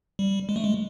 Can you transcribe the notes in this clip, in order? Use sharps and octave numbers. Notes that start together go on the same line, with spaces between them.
G3
G#3
A3
G#3